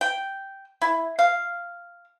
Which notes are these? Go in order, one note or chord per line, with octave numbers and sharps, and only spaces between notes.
G5
E4
F5